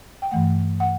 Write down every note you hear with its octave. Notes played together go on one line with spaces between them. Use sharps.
G5
G2 E3 A3 F#5
F#5